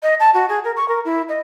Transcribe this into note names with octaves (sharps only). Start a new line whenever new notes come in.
D#5
A5
F#4
G#4
A#4
C#6
A#4
E4
D#5